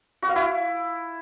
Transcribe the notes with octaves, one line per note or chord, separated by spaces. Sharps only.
F#4
F5
E4